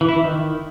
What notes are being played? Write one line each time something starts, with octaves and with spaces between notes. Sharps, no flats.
E3
E4
E3
D#3